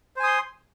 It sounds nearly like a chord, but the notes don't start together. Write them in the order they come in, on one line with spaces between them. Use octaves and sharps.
C5 G#5 D#6 C6